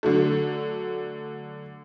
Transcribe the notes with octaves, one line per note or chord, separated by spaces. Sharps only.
D3 F#3 A3